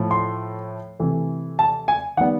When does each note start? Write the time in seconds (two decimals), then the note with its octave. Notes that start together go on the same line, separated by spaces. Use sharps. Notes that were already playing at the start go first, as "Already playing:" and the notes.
Already playing: A2 F3 A3
0.11 C6
1.00 C3 E3 A3
1.59 A5
1.88 G#5
2.17 D#3 F#5
2.20 G3 B3